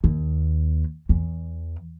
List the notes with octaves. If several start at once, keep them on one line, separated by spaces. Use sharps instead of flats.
D#2
E2